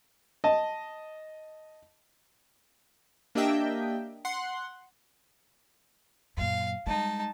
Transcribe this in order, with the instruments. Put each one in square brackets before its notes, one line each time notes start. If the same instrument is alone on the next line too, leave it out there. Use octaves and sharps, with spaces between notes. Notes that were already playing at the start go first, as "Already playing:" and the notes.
[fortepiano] D#5 A5
[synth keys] A#3 D4 G4 D#5 E5 G5
F#5 C6
[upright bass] F#2 A#2 [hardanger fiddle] F5
[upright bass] G3 G#3 [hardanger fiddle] D#4 A5